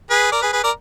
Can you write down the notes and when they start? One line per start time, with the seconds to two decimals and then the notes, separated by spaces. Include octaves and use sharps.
0.10 G#4 B4
0.32 A#4 D5
0.42 G#4 B4
0.53 G#4 B4
0.64 A#4 D5